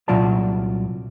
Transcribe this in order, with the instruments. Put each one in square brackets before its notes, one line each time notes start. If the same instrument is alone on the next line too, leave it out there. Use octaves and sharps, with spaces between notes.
[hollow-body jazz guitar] C2 A#2 F#3 F4 D5 A5